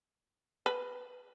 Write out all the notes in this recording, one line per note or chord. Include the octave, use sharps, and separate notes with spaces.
B4